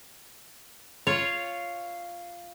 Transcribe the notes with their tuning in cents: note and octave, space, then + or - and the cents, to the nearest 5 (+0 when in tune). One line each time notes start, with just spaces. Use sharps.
F4 -5 C#5 +0